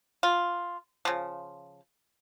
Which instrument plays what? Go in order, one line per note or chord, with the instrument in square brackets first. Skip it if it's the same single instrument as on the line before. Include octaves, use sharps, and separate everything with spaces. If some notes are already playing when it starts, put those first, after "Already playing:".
[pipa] F4
C#3 F3